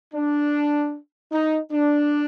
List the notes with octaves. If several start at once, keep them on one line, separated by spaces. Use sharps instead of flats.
D4
D#4
D4